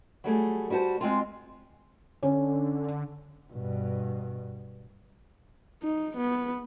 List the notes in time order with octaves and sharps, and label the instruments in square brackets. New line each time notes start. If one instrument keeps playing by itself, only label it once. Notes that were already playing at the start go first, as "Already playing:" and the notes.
[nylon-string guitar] F#3 G3 A3 G#4
G3 E4 F#4 C5 A5
G#3 C4 F4
[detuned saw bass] D3 [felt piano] C#4
[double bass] G2 B2
[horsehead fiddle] D#4
B3